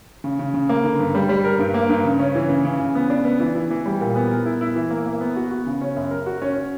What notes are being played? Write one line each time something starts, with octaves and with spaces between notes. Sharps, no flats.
C#3
C#3
C#3
A#3
D3
G2
G3
G3
A#4
G2
A#3
G2
C#3
C#4
E3
C#3
C#3
C#3
B3
D4
B3
E3
E3
E3
G3
A#2
B3
A#4
E4
E4
E3
A#3
A#3
B3
F#4
F#4
C#3
C#4
F#2
A#4
F#4
C#4
C#4